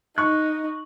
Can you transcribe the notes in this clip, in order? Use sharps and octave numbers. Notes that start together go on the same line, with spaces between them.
D#4 C#6 F#6